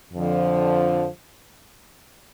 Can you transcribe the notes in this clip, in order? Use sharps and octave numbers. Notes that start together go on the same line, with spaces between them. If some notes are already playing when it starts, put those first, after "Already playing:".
F2 D3 F3